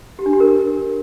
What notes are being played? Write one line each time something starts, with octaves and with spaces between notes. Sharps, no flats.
G4
D4
G4
A#4